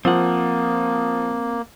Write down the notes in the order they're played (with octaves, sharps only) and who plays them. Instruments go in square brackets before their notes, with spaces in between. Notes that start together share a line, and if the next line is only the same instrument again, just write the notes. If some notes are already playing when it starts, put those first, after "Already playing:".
[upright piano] F3 [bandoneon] A#3 [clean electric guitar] C4 F#5